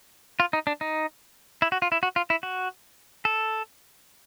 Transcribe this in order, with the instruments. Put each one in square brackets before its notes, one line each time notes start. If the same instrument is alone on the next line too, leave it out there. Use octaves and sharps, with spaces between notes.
[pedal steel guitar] F4
D#4
D4
D#4
E4
F#4
F4
E4
F#4
F4
E4
F#4
A4